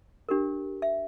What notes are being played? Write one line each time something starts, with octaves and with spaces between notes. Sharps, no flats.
D4 G4 A#4
E5